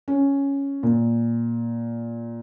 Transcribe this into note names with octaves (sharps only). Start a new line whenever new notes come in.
C#4
A#2